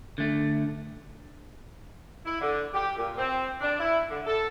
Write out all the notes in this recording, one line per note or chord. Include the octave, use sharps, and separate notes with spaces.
D3 A3
E4
D3
G4
A#2
C4
D4
E4
D3
A4